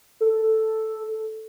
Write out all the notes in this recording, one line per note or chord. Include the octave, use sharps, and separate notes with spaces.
A4